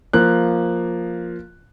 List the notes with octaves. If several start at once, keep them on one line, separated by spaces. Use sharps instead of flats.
F3 A#3 F#6